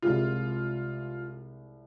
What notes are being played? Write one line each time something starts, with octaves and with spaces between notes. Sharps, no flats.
C2 C3 G#3 F4